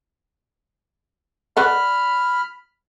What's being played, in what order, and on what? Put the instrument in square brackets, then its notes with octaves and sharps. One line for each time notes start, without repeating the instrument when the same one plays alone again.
[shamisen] B4 D5 F#5 [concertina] B5 F6